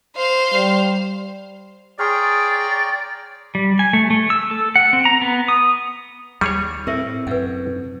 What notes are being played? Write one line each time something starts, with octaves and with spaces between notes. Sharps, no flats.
C5 F5
G3
G#4 C#5 D5 G5 A#5 C6 C#6 F6
G3
G#5
A3
A3
E6
A4
F#5
C4
A#5
B3
D#6
D#2 G3 G#4 C#5 C#6
A2 C4 E4 A4 A#4 E5
F#2 B4 F#5